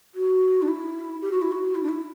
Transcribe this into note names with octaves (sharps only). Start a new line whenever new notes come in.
F#4
D4
E4
G4
F#4
E4
F#4
E4
D4
E4